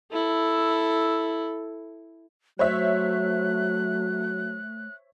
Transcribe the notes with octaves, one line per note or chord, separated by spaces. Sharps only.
E4 A4
F#3 A3 C5 C#5 E5 F#6